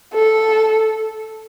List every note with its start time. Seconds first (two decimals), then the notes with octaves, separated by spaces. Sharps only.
0.14 A4